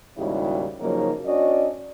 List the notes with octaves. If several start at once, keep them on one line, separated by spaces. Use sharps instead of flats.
D#2 G#2 C#3 G3 E4 F#4
C#3 F3 F#3 A#3 D#4
C#4 D4 F#4 D5 D#5